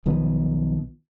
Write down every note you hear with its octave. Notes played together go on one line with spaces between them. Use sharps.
B1 D#3 F3 B3